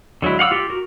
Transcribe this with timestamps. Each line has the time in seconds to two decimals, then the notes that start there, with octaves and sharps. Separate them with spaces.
0.22 D3 F#3 G#3 E4
0.39 F5 F#5 D6 E6
0.51 F4 G4
0.70 F#4 A#4